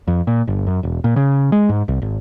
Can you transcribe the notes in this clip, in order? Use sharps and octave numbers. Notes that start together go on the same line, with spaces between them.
F2
A#2
G1
F#2
E1
A#2
C#3
G#3
G#2
C2
G#1